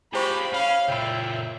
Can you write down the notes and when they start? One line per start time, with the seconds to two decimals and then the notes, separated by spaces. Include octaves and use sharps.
0.14 E4 F4 G4 G#4 C5 B5 C#6
0.53 C#4 F5
0.88 C#2 A#2 C#5 E5 G5 B5